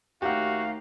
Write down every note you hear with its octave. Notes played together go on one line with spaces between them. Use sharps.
D#2 A3 D#4 F#4 G4 F5 F#5